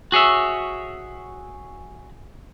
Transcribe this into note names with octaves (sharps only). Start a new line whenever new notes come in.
F#4 G#4 C#5 E5